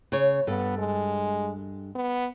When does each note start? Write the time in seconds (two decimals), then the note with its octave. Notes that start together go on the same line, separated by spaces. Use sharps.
0.12 C#3 C#5
0.47 G2 B3 A4
0.78 G#3
1.95 B3